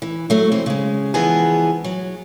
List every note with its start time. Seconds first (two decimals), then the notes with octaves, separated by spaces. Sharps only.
0.02 E3
0.30 F#3 A3
0.52 E3 C4 C5
0.66 C#3 G#3
1.14 E3 F3 G#3 B3 G#4
1.84 F#3